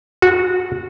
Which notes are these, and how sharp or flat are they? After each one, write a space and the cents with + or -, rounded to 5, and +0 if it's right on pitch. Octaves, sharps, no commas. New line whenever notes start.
F#4 -15